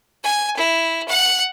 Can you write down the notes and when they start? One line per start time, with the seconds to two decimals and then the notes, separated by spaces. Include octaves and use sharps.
0.24 G#5
0.57 E4
1.08 F#5